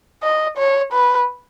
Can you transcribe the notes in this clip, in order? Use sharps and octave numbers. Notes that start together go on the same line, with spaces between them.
D#5
C#5
B4